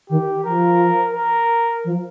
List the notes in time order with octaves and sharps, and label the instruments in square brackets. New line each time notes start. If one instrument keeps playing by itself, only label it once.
[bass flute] D#3 [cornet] G4
[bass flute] F3 [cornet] A#4
[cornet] A#4
[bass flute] F3